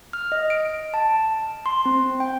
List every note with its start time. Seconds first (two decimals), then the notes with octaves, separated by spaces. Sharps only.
0.13 F6
0.32 D#5
0.50 D7
0.94 A5
1.66 C6
1.86 C4
2.20 G5